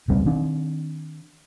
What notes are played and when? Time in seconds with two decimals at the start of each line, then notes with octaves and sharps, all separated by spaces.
0.08 E1 C#2 G3 C4
0.26 D#3 C4 D4